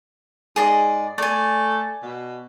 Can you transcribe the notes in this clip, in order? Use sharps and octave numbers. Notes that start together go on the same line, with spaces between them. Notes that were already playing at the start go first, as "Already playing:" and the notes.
G#2 G#4 D5 D#5
A3 D5 G#5
B2